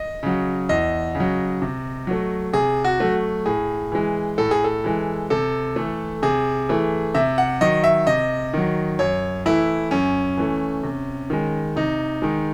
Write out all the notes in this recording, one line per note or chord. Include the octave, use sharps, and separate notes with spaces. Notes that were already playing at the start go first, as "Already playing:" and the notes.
Already playing: D#5
C#3 F#3
E2 D#5
C#3
F#3
C3
F#3 A3
C3 G#4
F#4
F#3 A3
A2 G#4
E3 G#3
A2 A4
G#4
A4
E3 G#3
C3 A4
E3 A3
C3 G#4
E3 A3
C3 E5
F#5
D#3 F#3 D#5
E5
C3 D#5
D#3 F#3
F#2 C#5
E3 A3 E4
F#2 C#4
E3 A3
C3
D#3 G#3
C3 D#4
D#3 G#3